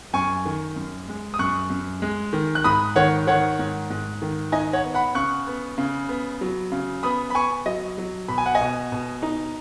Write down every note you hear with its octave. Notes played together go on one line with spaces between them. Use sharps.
F#2 G#5 C#6
D#3
F#2
G#3
D#6
F#2 C#6 F#6
F#2
G#3
D#3
F#6
G#2 B5 D#6
D#3 C#5 F#5
D#3 C#5 F#5
G#2
G#2
D#3
D#4 D#5 G#5
C#5 F#5
B3
F#5 B5
C#3 C#6 F#6
B3
C#3
B3
F#3
C#3
B3 B5 D#6
B5
B3 G#5 C#6
F#3 D#5
F#3
B2 B5
G#5
F#5
D#5 G#5
B2
B2
D#4